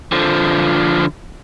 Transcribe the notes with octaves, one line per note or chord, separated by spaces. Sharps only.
D3 F3